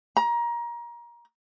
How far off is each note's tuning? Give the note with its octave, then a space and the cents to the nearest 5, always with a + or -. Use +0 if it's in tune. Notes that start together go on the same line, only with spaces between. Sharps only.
A#5 +25